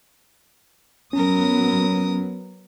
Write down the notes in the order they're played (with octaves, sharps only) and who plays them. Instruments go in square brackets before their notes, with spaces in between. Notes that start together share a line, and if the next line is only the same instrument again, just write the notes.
[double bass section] F#3 B3 [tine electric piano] C#4 [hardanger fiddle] A#4 D#6